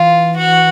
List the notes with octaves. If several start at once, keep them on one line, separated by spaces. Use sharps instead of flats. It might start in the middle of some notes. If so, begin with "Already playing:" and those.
Already playing: E3 F4
F#4